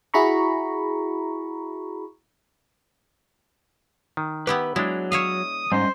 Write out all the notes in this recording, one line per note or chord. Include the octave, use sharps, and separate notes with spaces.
E4 F#4 G#4 A#5 B5 C#6
D#3
B3 E4 G4 B4
F#3 G#3 D4 E4
C#5 E5 F5 D#6
G#2 G3 C#4 C5 D#5